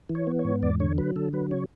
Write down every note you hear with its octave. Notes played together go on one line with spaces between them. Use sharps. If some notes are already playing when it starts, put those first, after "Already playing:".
E3
C#5
B3
C#5
G#2
E2 D5
D3 C#5
F#3 B4
D3 A4
F#3 B4
C#3 C#5